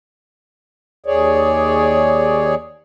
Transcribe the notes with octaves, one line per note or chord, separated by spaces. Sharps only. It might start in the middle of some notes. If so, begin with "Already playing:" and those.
D#2 G#4 C#5 D5